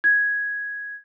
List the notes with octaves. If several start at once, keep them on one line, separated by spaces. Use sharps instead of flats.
G#6